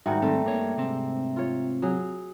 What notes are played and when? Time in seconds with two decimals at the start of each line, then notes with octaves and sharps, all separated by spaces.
0.06 G#2 D#3 G3 F#4 E5 G5 A#5
0.22 D#2 G3 A3 C4
0.45 G2 A#3 C#5
0.77 G#2 C3 C4
1.36 F4 C#5
1.82 F#3 G#4